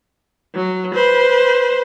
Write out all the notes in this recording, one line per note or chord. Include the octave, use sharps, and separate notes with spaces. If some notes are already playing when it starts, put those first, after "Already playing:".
F#3
B4 C5